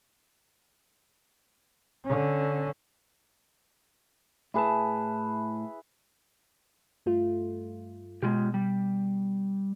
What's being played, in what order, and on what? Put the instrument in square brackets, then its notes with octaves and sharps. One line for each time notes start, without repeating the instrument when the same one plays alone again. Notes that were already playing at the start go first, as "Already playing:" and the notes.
[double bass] D3 C#4
[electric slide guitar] A2 A5 [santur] E4 G#4 B4
[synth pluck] G2 A3 F4
[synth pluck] B2 [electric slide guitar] G#3 F4 G4
[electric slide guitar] G3